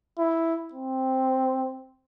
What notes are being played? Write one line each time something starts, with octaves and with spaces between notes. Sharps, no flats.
E4
C4